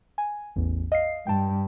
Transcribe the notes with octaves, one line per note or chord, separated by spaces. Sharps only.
G#5
A1 E2
D#5 F5 C7
G2 G5 A5